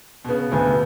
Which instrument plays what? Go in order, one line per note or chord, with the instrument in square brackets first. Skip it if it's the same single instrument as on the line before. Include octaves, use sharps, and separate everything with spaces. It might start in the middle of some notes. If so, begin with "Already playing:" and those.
[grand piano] B2
[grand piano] C#3 [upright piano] B3
[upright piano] D2 [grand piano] B2